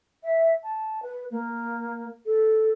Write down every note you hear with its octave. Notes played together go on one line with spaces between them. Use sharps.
E5
A5
B4
A#3
A4